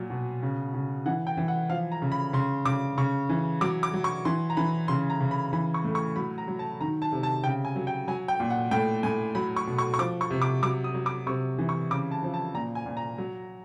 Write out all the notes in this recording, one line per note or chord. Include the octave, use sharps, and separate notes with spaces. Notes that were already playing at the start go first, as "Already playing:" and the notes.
Already playing: A#2 F#3
B2
C#3
C#3
E3 F#5
G5
E3
F#5
F3 F5
A#5
C#3
B5
C#3 C6
C#3 D6
C#3 C#6
E3
F#3 D6
D6
F#3
C#6
E3 C6
A#5
E3 B5
C#3 C6
A#5
C#3
B5
E3 B5
C#6
A2
C#6
F#3 B5
A#5
F#3
A5
D#3 A#5
A5
C3
A5
C#3 G5
G#5
F#3
G5
F#3 G#5
G5
A#2
F#5
A2 G5
A2 G#5
F#3 B5
C#6
B2
C#6
C#6
F3 D6
C#6
C3
D6
F#3 D6
D#6
F#3
D6
C3 C#6
E3
C#6
C#3 D6
A5
F3
A5
A#2 A#5
G#5
A#2
A#5
F#3